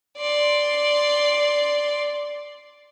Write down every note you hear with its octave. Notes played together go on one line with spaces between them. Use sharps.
D5 C6